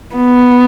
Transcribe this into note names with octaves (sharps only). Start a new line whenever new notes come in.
B3